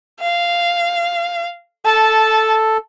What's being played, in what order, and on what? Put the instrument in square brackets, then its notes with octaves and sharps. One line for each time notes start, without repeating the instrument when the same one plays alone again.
[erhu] F5
[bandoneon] A4 [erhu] A5